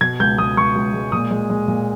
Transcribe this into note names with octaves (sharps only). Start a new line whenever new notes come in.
B2 G#6
C#2 G6
C#2 D#6
C#2 C#6
C#2
G#3
A#2 D#6
G#3
G#3
A#2